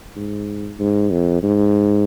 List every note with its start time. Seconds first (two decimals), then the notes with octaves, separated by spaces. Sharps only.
0.16 G#2
0.79 G#2
1.11 F2
1.43 G#2